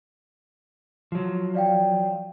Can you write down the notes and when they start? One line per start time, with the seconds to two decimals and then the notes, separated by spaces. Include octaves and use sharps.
1.12 F3 F#3
1.54 D5 F5 G5